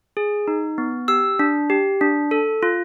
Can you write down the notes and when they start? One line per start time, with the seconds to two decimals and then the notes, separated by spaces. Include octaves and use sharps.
0.17 G#4
0.48 D#4
0.78 B3
1.08 G4 E6
1.39 D4
1.70 G4
2.01 D4
2.31 A4
2.63 F4